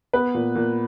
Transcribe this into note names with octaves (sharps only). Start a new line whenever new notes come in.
B3 B4
A#2
A#2